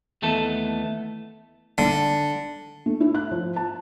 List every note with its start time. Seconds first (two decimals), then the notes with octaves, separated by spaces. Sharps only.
0.22 D#2 E3 A3 B3 A4
1.78 D3
2.86 A3
3.00 E4
3.14 F#6
3.31 F3
3.56 A5